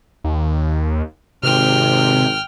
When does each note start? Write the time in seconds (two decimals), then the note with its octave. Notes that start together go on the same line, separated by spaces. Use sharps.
0.24 D#2
1.43 G#1 C3 G5 F6